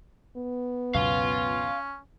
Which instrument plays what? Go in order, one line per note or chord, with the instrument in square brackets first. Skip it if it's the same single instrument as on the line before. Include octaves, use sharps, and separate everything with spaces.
[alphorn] B3
[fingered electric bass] C#2 F#2 B2 [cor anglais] C#4 [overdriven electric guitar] F5 C6